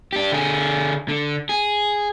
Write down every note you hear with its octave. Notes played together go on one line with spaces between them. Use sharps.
D4 G4
D3 G#4
D3
G#4